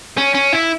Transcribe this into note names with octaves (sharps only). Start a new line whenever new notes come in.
C#4
C#4
E4